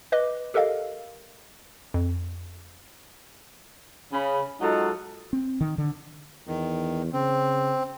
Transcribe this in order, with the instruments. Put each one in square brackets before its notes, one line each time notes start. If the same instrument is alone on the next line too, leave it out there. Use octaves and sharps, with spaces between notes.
[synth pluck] B4 D#5 D6
G4 A4 A#4 D#5 F5
F2
[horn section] C#3 B5
F#3 G#3 D#4 F4 F#4 A4
[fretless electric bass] C4
D#3
D3
[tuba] E2 [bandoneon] D#3
[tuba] C#3 [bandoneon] C4